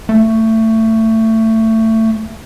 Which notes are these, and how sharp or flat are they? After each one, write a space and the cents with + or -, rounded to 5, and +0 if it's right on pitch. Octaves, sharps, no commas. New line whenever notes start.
A3 +20